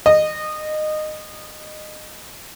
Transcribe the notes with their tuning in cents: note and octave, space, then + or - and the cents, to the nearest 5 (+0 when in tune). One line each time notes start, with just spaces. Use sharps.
D#5 -20